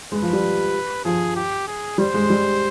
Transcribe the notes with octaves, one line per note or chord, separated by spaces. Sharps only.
G#3 B4
F3
G3
F3 G#4
G4
G#4
G3 C5
G#3
G3